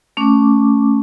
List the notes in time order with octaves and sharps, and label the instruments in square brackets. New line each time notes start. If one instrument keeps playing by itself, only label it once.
[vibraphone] A3 C#4 D6